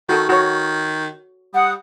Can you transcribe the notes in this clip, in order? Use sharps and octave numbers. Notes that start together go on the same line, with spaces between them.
D#3 F#4 A4
D#3 F#4 C#5
G3 F#5 D#6